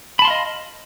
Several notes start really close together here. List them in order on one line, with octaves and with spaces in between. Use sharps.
B5 A5 C6 F5 D#5